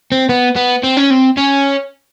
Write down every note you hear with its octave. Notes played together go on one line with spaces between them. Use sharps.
C4
B3
B3
C4
C#4
C4
C#4